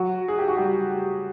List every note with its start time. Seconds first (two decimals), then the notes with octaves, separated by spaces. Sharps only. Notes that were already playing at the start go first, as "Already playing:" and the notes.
Already playing: F#3 F#4
0.28 G#4
0.39 G4
0.48 F#4
0.57 G3 G4